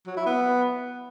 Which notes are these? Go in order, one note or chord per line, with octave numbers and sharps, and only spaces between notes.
F#3
E4
B3